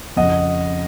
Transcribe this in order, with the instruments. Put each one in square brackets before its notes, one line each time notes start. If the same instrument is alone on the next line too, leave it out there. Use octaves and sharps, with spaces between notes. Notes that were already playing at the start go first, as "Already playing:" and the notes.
[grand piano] F2 C#3 F3 D#5 F#5